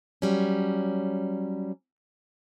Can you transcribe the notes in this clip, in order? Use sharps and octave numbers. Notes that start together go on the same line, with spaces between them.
F#3 G3 C#4